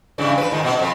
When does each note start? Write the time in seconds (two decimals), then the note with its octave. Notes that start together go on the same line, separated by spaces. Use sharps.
0.18 G2 C#3 E3
0.38 F3 B4
0.51 G#2 D#3 F4
0.64 B2 C4
0.79 F2